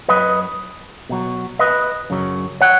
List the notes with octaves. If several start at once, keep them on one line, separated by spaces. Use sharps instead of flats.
F#2 F#3 B4 D#5
B2 F#3
B4 D#5
F#2 C#3 F#3
C#5 F#5